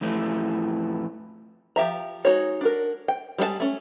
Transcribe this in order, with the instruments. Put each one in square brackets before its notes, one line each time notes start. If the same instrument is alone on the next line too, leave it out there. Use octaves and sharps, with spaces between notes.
[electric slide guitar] F2 A2 E3 A3
[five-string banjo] F3 G4 E5 A#5
G#3 D#4 F#4 C#5
D4 F#4 A#4
G5
G3 G#3 D4 G#5 A5
A3 C#4